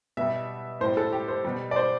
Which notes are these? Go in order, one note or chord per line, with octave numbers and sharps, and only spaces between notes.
B2 G3 E5
A2 G3 C5
A4
G4
C5
B2 G3
D5
C5